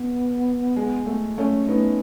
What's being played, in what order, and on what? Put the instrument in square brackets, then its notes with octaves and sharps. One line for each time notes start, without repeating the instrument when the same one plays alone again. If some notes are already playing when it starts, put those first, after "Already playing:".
Already playing: [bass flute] B3
[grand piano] G#3
A3
A3 C#4
[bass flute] A3 [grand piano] B3 D#4